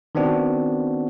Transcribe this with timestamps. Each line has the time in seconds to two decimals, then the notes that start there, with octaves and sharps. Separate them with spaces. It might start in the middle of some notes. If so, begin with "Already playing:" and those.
0.15 D#3 B3 C4 D4 F#4